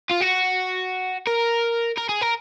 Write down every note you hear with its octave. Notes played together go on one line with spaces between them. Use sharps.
F4
F#4
A#4
A#4
G#4
A#4